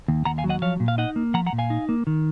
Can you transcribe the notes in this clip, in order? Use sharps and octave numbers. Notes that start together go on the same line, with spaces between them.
D#2
D#2 F#5 A#5
F5 G#5
F#3
D#5 F#5
F3 C#5 F5
A#2
F5
D#4 D#5 F#5
A#3
F3 F#5 A#5
F#5 A#5
A#2
F5 G#5
D#4
A#3
D#3